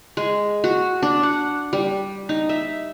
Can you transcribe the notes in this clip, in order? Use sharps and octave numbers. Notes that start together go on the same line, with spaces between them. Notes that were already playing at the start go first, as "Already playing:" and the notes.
G#3
F#4
D4
F#5
G3
D#4
E5